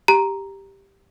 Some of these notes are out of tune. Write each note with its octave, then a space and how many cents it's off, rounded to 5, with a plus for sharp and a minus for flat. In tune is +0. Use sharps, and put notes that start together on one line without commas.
G4 +5 A#5 +0